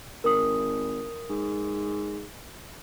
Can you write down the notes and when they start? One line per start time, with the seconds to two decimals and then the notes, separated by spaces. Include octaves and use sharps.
0.24 G#1 A#4 D#6
1.29 G#2